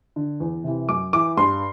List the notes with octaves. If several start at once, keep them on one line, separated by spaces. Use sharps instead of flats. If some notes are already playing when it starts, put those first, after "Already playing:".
D3
E2
C3 E3
F#2 D6
E3 D6
G2 C6